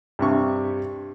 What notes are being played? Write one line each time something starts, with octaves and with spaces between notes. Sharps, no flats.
G2 C3 C#6